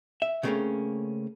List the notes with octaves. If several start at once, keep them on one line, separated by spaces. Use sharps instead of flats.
E5
C#3 G3 A3 A#3 C4 C#4